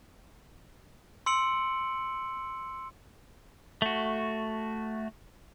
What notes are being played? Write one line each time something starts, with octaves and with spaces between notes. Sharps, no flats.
C6 E6 C#7 D7 F#7
A3 F#4